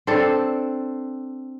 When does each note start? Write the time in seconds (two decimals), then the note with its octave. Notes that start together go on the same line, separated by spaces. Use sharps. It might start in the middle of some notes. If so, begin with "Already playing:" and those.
0.07 C4 D4 A4 C5